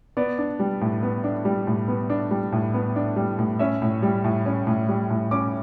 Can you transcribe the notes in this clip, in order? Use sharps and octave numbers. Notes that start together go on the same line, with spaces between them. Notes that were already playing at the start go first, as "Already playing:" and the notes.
B3 D5
D4
G3
A2
B3
D4
G3
A2
B3
D4
G3
A2
B3
D4
G3
A2
C#4 E5
A2
G3
A2
C#4
A2
G3
A2
C#4 D6